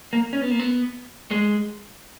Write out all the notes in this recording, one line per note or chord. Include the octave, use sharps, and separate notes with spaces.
A#3
C#4
B3
A#3
B3
G#3